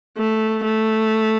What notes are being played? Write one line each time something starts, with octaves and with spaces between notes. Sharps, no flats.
A3
A3